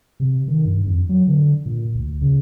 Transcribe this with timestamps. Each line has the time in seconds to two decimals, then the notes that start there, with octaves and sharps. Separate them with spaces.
0.20 C3
0.48 D#3
0.65 G2
0.86 F2
1.09 F#3
1.27 D3
1.66 A#2
1.95 D2
2.21 C#3